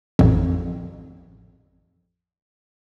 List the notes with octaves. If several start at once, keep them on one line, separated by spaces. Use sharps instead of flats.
A1 F2